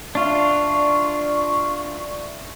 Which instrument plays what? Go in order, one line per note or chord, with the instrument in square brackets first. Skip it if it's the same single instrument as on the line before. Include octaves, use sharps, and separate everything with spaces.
[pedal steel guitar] D4 F4 [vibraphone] D5 E5 [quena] C#6